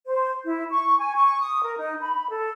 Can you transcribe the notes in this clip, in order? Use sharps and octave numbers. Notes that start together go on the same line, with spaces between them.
C5
E4
C#6
G#5
C#6
D#6
A#4
D#4
B5
A4